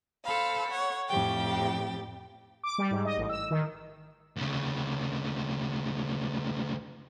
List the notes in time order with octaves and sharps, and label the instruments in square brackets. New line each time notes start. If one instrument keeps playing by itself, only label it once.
[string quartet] A4 C5 F5 B5
C#5 F#5
F2 A2 G4 G5 A6
[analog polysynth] D6
G3
G#2
D#5
A1
E6
D#3
[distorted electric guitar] D2 C#3